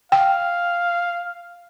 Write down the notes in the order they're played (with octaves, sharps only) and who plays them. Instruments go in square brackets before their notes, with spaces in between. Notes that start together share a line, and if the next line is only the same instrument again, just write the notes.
[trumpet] F5 [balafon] G5